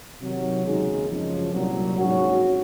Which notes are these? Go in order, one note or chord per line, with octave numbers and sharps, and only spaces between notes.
C3 D#3 F#3
D#2 C#3 G#3 D#4
F#2 C#3 F3
C2 A#2 F#3
A#1 G#2 F#3 C#4 F#4